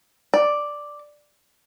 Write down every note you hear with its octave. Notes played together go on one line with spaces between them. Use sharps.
D5